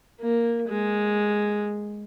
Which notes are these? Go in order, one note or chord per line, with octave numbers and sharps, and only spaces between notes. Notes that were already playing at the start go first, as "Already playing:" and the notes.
A#3
G#3